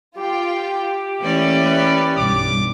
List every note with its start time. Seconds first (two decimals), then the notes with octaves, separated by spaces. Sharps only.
0.17 F4 G4 G5
1.21 E3 A3 A#3 C#4 D5 E5
1.66 B4
2.18 B1 G2 D6